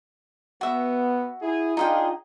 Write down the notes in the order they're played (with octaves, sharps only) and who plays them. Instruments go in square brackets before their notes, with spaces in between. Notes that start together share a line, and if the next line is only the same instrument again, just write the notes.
[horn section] B3 [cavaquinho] F#4 E5
[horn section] E4 G#4
[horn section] D4 F4 G#4 [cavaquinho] D#4 D#5 G5